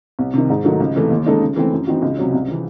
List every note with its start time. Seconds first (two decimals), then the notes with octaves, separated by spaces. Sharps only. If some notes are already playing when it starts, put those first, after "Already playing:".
0.19 C2
0.34 C3 D#3
0.50 G#2
0.64 D#3 F#3 A3
0.80 C#2
0.95 C3 E3 A3
1.10 D#2
1.26 C#3 G#3 D#4 A4
1.41 C#3
1.56 E3 A3 C4
1.71 F#2
1.87 E3 C4 D#4 F#4
2.02 C#2
2.17 C3 F#3 C#4
2.33 C2
2.48 C3 E3